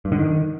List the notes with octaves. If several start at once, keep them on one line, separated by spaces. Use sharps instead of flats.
G2
D3
D#3